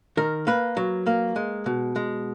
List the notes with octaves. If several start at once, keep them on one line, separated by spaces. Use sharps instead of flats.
D#3 A#4
A#3 B4
F#3
A#3
G#3
B2
G#3